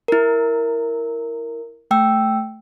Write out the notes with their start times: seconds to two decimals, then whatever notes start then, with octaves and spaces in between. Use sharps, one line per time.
0.08 E4 A#4
1.91 A3 G5 E6